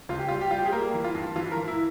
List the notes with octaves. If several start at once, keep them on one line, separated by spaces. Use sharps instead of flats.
C#2 F4
G4
G3 F4
G4
G3 F4
G4
G#4
A#3 A#4
E3
F4
G2
E3 F4
A#4
E3
E4